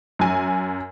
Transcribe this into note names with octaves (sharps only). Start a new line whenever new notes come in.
F#2 G#5